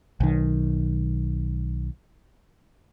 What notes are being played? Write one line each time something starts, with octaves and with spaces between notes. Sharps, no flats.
B1 D#3